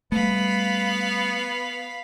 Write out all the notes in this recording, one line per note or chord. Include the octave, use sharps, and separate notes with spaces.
G3 A3 B3 F5 B5